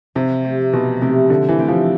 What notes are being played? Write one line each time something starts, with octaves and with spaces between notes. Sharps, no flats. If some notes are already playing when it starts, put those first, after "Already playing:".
C3 F3
A3 C4 G4
B2 F3
C3 A3 C4 G4
D3 F3
E3
A3 C4 G4
F3